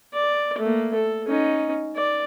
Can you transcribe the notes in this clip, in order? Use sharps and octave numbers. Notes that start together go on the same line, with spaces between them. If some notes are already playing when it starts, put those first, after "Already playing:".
D5
A3 A#3
A4
C#4 D#4
D5